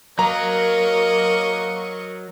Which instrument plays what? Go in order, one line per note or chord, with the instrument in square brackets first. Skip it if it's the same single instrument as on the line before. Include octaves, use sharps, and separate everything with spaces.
[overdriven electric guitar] F#3 [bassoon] A#3 [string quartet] A#4 D#5 C#6 [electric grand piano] A#5